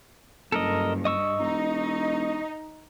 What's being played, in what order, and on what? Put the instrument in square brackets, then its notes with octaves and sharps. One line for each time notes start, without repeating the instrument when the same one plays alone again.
[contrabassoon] F#1 [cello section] G2 [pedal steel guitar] A4 A#4 D#5
[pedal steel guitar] D#5 C#6 E6
[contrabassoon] E1 [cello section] D#4